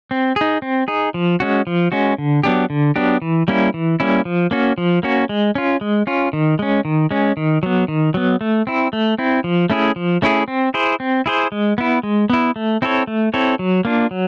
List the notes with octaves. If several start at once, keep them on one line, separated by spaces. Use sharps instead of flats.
C4
D#4 G#4
C4
D#4 G#4
F3
G#3 C#4 F#4
F3
G#3 C#4 F#4
D3
F#3 B3 D4 G4
D3
F#3 B3 D4 G4
E3
G3 A#3 C#4 E4
E3
G3 A#3 C#4 E4
F3
A#3 C#4 F#4
F3
A#3 C#4 F#4
G#3
C#4 F4
G#3
C#4 F4
D#3
G#3 C#4
D#3
G#3 C#4
D#3
F#3 B3
D#3
F#3 B3
A3
C4 E4
A3
C4 E4
F3
A3 C#4 E4 G#4
F3
A3 C#4 E4 G#4
C4
E4 G#4 C5
C4
E4 G#4 C5
G#3
B3 E4
G#3
B3 E4
A3
C4 E4 A4 C#5
A3
C4 E4 A4 C#5
F#3
A#3 D4 F4
F#3